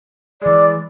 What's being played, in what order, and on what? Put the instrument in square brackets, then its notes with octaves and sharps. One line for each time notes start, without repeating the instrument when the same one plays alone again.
[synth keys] E3 G#3 [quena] D5